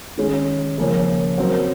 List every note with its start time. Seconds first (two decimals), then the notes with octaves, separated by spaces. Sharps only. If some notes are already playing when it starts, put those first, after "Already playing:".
0.18 D#3 G#3 C#4 G#4
0.78 C#3 F3 A#3 C#4
1.38 F#3 C4 F#4 A#4